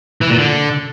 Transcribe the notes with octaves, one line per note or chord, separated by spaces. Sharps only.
E3
A#2
D3